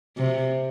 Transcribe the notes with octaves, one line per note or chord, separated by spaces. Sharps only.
C3